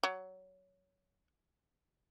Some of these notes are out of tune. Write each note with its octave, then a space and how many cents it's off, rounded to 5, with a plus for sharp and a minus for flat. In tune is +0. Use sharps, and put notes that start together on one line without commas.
F#3 +15